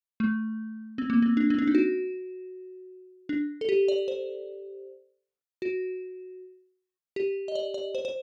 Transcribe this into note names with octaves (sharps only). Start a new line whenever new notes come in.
A3
C4
A#3
C4
D4
C4
D4
D#4
F#4
D4
A4
G4
D5
C5
F#4
G4
D#5
D5
D5
C5
C5